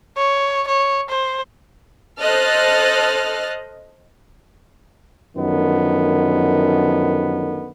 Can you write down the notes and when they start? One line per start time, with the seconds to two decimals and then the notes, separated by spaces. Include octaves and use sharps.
0.17 C#5
0.68 C#5
1.10 C5
2.20 A4 C5 D#5 F6 F#6 A6
5.38 F#2 D3 D#3 F3 B3